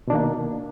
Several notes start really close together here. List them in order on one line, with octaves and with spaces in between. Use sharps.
B2 D4 D#3 A#3